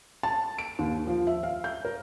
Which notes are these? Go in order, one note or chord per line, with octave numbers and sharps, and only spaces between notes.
A5
D7
D#2
F3
E5
F5
G6
A#4